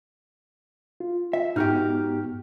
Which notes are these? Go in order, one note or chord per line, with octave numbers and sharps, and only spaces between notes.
F4
E5
G#2 B3 D#4 F#4 G4 F6